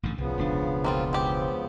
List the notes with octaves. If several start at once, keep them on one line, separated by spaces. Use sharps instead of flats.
A1 G#2 D3
C2 C#3 F3 B3
E1 C#2 D4
A#3 C4 F4
C4 G4